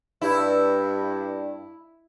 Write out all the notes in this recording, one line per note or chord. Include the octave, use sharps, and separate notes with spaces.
G2 E4